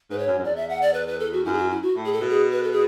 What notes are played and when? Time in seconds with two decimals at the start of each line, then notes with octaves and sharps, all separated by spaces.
0.10 G#2 B4
0.19 C#5
0.27 F#2
0.39 F#2
0.44 E2 D5
0.56 E5
0.70 F#5
0.82 D5
0.94 B4
1.07 B4
1.20 A4
1.33 F#4
1.45 F#2 E4
1.53 G#4
1.58 F#4
1.70 E4
1.83 F#4
1.96 A2
2.05 G#4
2.12 A4
2.21 B2
2.30 G#4
2.52 B4
2.63 A4
2.72 G#4